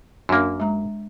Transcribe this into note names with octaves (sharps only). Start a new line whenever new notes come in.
F#2 A#3 D4
G#3 A#5